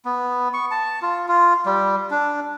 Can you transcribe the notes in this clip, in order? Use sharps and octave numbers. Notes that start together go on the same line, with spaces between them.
B3
C#6
A5
F4
F4
G3
D4